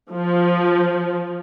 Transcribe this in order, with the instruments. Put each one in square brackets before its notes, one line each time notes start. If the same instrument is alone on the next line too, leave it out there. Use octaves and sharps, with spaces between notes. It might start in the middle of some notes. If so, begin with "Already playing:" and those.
[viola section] F3